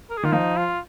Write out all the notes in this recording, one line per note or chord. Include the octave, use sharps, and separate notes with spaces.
A#4
G#4
D#3 F4
F3 D#4
F4